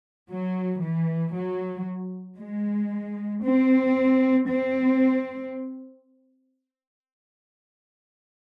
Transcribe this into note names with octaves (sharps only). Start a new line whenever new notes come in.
F#3
E3
F#3
G#3
C4
C4